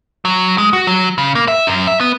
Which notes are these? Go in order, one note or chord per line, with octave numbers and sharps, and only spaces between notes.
F#3
G#3
F#4
F#3
C#3
A#3
E5
F#2
E5
B3